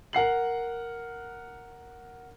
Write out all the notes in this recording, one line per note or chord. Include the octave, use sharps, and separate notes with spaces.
A#4 F#5 C7 F#7